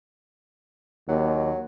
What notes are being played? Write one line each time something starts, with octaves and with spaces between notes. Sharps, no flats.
D#2 F#3